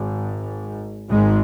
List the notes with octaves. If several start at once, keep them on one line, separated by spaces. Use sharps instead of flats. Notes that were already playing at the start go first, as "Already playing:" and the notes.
Already playing: G#1 G#2
G#1 G#2 G#3